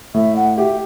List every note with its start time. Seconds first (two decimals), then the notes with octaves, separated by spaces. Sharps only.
0.14 A2 E5
0.36 F#5
0.58 G4 E5